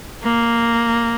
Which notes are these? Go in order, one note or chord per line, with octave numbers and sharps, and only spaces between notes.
A#3